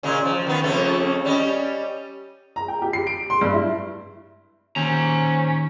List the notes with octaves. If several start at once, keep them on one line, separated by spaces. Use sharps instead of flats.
A#2 C#3 G#3
F3
D#3 B3
F2 C#3 A3
G3 C#4 D#5
A#5
G5
G4
C7
D7
C6
G2
E4
D#2 C#4 C5 A#5